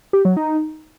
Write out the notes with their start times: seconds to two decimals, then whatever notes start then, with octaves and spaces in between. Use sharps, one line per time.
0.13 G4
0.25 F#3
0.37 D#4